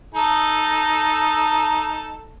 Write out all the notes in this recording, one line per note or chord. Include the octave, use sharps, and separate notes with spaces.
D#4 A4